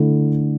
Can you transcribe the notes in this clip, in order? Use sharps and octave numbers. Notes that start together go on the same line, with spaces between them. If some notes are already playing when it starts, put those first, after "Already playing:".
Already playing: D3 A3 E4